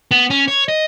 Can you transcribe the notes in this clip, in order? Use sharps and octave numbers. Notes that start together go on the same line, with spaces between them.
B3
C#4
C#5
D#5